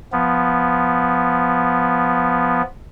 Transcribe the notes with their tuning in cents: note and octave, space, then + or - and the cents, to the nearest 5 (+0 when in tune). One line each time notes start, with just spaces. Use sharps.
F3 +0 B3 +0